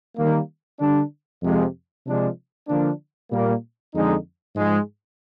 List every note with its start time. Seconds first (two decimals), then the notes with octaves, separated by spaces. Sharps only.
0.17 D#3 G3 A#3
0.79 D3 G3 D4
1.43 F2 C3 F3 G#3
2.05 C3 F3 G#3 D4
2.68 D3 F3 A#3 D4
3.31 A#2 G3 A#3
3.94 F2 D3 G#3 D#4
4.56 G#2 F3 G#3